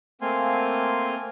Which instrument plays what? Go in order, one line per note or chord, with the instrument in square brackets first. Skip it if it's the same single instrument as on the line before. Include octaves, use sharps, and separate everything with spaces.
[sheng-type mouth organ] A3 A#3 C4 F5 G#5 C6